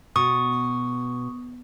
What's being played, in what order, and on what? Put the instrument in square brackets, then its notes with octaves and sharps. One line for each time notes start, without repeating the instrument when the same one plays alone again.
[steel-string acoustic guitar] B2 [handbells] C#6 D#6